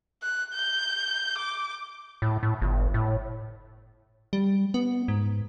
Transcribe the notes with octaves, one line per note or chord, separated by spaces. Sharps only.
F#6
G6
D6
A2
A2
G1
A2
G3
B3
G#2